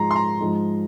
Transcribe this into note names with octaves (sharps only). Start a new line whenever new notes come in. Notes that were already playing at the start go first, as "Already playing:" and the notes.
Already playing: G#2 F3 G#3 A#5 C6
C6
A#5
G#2 F3 G#3